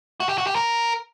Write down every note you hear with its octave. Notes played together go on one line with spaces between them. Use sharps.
F#4
G4
F#4
G4
A#4